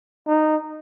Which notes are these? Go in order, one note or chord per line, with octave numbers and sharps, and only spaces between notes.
D#4